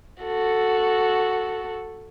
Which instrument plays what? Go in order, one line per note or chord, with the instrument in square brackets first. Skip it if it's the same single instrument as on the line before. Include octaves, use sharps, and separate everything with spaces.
[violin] F#4 A4